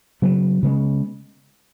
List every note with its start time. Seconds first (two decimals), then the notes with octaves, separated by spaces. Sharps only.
0.22 C#3 F#3 B3
0.63 C#3 G#3 B3